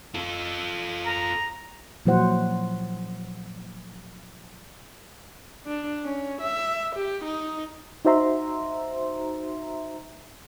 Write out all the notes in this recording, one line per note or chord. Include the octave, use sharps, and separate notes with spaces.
F4 A4
A#5
A#2 F3 F#3 E4 C5 F#5
D4
C#4
E5
G4
D#4
D#4 F#4 C5 E5 A#5 C6